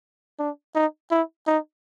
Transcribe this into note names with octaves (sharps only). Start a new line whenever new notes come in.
D4
D#4
E4
D#4